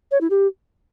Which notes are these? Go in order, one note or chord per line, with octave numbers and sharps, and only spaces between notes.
C#5
E4
G4